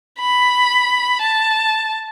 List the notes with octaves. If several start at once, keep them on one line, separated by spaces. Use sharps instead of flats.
B5
A5